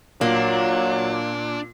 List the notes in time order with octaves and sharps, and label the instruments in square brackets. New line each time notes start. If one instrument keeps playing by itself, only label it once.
[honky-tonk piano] A#2 [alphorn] F#3 [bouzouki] A#3 [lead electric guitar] D4